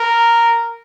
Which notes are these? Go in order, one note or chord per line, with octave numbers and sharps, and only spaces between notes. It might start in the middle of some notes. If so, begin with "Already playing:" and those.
Already playing: A#4